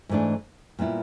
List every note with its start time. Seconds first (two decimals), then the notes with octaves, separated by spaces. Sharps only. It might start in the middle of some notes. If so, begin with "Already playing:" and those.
0.09 G#2 E3 A3 D4
0.79 A#2 G3 B3 E4